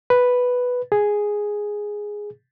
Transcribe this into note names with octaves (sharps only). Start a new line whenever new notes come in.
B4
G#4